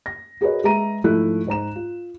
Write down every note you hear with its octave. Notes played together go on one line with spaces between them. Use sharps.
A#6
F#4 G#4 A#4 B4 C#5 D#5
G#3 G#4 B4 E5 A#5 D#7
G#2 F3 A3 E4 F#6
G#2 C5 A#5 E7
F4